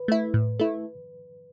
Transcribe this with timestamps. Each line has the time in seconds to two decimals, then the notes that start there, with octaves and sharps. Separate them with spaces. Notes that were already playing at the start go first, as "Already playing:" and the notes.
Already playing: B4
0.08 A3 E4
0.34 A2
0.60 A3 E4